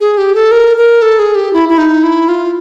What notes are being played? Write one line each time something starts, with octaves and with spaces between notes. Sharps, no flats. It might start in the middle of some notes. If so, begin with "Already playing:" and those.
G#4
G4
A4
A#4
A#4
A4
G#4
G4
E4
E4
D#4
E4
F4